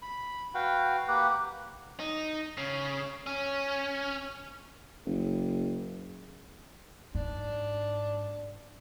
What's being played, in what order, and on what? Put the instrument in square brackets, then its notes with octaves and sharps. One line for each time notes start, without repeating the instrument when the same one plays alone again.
[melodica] B5
F#4 B4 F5 G5
A#3 G4 B4 F#5
[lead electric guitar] D#4
C#3
C#4
[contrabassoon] F#1
[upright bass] G#2 [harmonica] D4